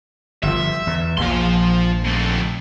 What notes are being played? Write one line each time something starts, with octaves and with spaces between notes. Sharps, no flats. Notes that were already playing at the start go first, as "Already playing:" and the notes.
G1 F3 E5
E2
A#1 A#2 F3 C6
F2 A3